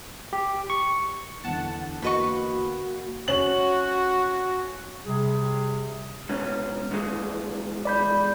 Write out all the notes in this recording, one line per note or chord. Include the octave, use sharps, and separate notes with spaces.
G4
C#6
E2 D3 F#5 A5
A#3 F#4 B4 D#5 C#6
C#4 F#4 F#7
C3 G3 G#4
G#2 B2 C#4
E2 A#2 G#3
D5 B5 G6